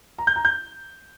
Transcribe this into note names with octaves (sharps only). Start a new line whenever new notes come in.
A#5
G6
A#5
G6